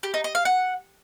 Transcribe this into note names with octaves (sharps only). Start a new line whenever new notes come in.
G4
D#4
D#5
F5
F#5